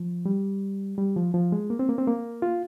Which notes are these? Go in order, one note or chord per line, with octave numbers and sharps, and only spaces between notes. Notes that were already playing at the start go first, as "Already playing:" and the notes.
Already playing: F3
G3
G3
F3
F3
G#3
A#3
C4
A#3
C4
A#3
F4